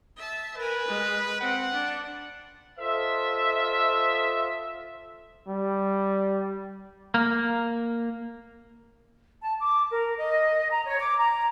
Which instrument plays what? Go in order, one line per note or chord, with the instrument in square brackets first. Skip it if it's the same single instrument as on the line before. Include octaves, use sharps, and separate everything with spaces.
[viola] E5 A5
[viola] A#4 G#5 [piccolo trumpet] B4
[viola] G#3
[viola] C4 [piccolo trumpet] F#5
[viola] D4
[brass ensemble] F4 A4 C5 D#5 E5
[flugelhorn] G3
[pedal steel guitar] A#3
[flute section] A5
D6
A#4
D#5
A#5
C#5
D6
A#5